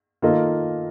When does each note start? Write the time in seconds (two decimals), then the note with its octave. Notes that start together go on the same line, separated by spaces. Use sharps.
0.22 D#3 A#3 F4 A4 D#5